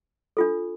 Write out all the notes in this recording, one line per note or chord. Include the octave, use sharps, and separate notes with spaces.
D4 F4 A4